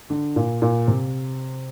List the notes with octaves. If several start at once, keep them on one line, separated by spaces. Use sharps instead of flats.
D3
A#2
A#2
C3